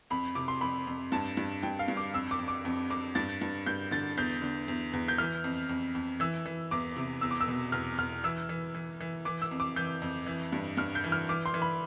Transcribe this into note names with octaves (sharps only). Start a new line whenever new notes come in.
F2 B5
C3 D6
C6
F2 B5
F2
G2 A5
G2
G2 G5
F5
G2
D6
F2 E6
D6
F2
D6
F2
F2 D6
G2 A6
G2
G2 G6
D3 A6
E2 G6
D3
E2
E2
G6
E3 F6
F2
F2
F2
E3 E6
E3
E2 D6
C3
E2 E6
D6
E6
B2
E2 F6
E2 F6
E3 E6
E3
E3
E3
E3 D6
E6
F2
D6
E3 G6
F2
E3
G2
G2 F6
G6
E3
F6
E3 D6
C6
E3
B5